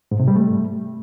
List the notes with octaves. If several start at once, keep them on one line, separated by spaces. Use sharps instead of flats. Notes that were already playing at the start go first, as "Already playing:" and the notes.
G#2
C3
G3
A3